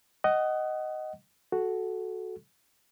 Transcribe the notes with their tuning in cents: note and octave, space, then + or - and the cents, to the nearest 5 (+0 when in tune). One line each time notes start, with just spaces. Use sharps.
D#5 +0 F#5 +25
F#4 +0 A4 -15